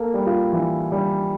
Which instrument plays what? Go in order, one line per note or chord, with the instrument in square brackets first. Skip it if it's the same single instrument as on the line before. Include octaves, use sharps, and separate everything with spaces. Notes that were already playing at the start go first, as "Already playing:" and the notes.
Already playing: [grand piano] A#3 [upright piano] A4
[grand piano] G3
[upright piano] F4
[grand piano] E3
G3